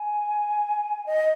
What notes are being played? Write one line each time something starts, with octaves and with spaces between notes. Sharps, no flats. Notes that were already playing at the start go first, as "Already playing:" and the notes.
Already playing: G#5
D#5